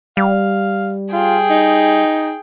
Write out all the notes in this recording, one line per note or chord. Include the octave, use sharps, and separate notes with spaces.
G3 F5
F4 G#4 G5
D#4